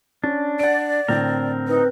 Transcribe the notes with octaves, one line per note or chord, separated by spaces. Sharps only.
C#4 D4
D5 F#5 D7
A2 D3 C4 A#4
D#4 B4